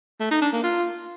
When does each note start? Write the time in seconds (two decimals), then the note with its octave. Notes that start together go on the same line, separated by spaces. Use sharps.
0.20 A3
0.31 D#4
0.41 D4
0.52 A#3
0.63 F4